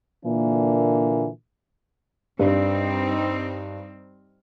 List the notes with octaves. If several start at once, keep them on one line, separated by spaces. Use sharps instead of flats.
A#2 D3 E3 A#3 D4
G2 G3 C4 D#4